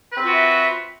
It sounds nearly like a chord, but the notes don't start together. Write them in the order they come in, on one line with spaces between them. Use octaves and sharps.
B4 C4 F4 F#4 E5